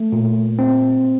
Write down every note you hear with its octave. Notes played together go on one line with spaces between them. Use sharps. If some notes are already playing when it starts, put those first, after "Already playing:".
Already playing: A3
A#2
C4